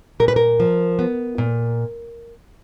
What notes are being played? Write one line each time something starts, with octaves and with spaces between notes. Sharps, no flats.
A#2 A#4
B4
A#4
F3
B3
A#2